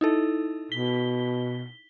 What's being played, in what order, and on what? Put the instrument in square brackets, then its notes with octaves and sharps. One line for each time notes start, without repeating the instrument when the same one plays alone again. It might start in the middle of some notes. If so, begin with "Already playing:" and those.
[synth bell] D#4 E4 A4
[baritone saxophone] B2 [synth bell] B6 G7